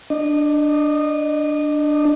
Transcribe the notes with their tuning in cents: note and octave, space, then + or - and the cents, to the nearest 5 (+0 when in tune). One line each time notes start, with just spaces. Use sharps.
D4 +5 D#5 -20